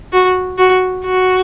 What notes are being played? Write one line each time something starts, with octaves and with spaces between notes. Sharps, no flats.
F#4
F#4
F#4